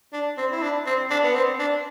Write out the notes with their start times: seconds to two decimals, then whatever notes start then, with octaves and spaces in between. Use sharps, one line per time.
0.13 D4
0.38 C4
0.52 E4
0.62 D4
0.86 C4
1.10 D4
1.24 B3
1.35 C4
1.59 D4